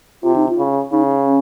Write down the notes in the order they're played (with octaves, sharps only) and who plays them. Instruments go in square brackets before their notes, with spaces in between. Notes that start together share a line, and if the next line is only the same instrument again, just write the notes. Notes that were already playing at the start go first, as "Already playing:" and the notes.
[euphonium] C3 [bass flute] F4
[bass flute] D#4
F4
[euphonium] C#3
[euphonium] C#3 [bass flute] D#4
[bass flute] C#4